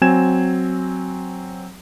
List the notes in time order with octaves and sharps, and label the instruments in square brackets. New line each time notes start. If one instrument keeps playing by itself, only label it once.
[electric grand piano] F#3 C4 G#5 G#6 E7